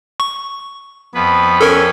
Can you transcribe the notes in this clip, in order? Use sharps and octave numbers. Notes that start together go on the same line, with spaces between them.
C#6
F2 B3 B4
C#4 A4 A#4